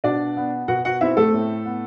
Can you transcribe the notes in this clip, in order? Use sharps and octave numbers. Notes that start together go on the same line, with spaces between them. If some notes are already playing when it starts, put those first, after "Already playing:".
B2 D4 D5
B3
B2 F#4 F#5
F#4 F#5
C4 E4 E5
A3 A4
A2
B3